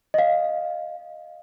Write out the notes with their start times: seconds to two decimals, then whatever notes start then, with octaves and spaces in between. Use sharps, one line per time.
0.14 D#5 F5